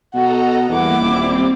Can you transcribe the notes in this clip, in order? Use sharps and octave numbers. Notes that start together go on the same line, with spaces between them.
B2 F#4 A4 D#5 F#5 A#5
E2 G3 A#3 E4 D6
D#1 G3 C4